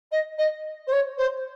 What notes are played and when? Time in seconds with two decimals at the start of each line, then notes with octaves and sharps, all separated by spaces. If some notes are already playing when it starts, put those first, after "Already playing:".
0.11 D#5
0.38 D#5
0.87 C5
0.92 C#5
1.17 C5